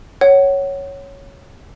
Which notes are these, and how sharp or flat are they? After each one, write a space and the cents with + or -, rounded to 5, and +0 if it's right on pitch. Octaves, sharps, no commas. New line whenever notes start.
C#5 +0 F#5 +20